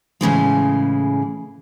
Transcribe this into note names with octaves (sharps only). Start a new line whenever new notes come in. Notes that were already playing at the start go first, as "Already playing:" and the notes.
A2 C#3 E3 G#3